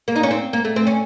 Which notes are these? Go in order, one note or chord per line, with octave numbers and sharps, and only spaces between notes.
A#3
D#4
C#4
C4
A#3
A3
C4
C#4